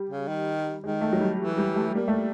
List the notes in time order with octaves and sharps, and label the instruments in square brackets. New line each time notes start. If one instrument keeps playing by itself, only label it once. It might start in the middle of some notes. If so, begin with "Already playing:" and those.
Already playing: [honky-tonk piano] G3
[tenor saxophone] C#3
D#3
[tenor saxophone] D#3 [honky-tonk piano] G#3
[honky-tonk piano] A3
F#3
G3
[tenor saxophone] E3
[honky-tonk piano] G3
A3
[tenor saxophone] G3 [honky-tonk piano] A#3
[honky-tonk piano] A3